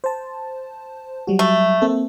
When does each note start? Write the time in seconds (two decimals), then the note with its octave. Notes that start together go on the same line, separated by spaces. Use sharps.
0.04 C5 A5
1.27 F#3 G3 F#4
1.39 A3
1.82 A#3 C4 A4